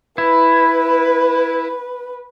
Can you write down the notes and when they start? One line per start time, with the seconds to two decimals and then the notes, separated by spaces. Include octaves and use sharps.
0.18 E4 B4